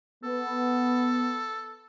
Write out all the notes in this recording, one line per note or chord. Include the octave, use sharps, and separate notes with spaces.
B3 A4